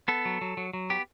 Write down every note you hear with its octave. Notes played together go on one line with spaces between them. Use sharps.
B3 A4
F#3
F#3
F#3
F#3
B3 G4